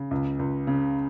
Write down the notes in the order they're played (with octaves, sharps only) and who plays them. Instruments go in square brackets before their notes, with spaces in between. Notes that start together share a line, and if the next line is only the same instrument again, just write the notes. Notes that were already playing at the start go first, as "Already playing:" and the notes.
Already playing: [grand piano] C#3
C#2
C#2
C#3